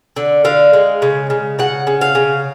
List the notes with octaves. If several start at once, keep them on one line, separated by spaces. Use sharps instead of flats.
D3
D3 F5
G#3
C#3
C#3
C#3 F#5
C#3
F5
C#3